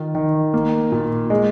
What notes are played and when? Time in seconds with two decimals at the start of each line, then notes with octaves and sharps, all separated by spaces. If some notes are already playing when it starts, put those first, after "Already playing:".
Already playing: D#3 F4
0.15 D#3
0.54 A#3
0.92 A#2
1.30 G#3